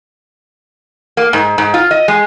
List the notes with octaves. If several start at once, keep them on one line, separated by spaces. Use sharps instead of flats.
A#3
G#2
G#2
F4
D#5
G#3